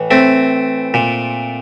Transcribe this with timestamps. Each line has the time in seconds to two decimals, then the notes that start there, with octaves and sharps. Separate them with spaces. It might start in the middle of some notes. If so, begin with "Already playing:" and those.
Already playing: A2 E3
0.11 A3 C4
0.94 A#2